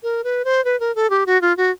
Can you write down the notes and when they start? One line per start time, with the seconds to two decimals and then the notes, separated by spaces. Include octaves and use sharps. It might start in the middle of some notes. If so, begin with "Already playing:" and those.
0.03 A#4
0.24 B4
0.45 C5
0.65 B4
0.80 A#4
0.95 A4
1.10 G4
1.26 F#4
1.42 F4
1.57 F#4